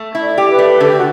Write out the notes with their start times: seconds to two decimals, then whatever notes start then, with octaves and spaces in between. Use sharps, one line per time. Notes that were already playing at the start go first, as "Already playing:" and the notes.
Already playing: A3
0.15 E4
0.22 D5
0.38 G4
0.52 B4
0.59 A3
0.80 D3 A4
0.89 G4
0.97 F#4